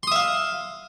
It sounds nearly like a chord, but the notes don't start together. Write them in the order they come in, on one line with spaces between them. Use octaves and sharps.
C6 D#6 E5 F5